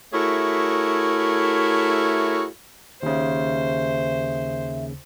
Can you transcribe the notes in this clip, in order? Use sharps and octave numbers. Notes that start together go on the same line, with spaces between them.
A3 E4 F#4 G#4 A#4 C#5
D#2 C#3 C5 E5